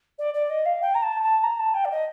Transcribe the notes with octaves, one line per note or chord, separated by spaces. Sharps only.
D5
D5
D#5
F5
G5
A#5
A5
A5
A#5
A5
G5
D5
D#5